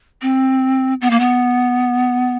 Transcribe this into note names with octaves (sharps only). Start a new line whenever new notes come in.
C4
B3
A#3
B3